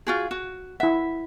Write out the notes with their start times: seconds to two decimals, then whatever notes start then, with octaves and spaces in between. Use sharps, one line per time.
0.07 F4 F#4 G#4
0.31 F#4
0.80 E4 E5 F#5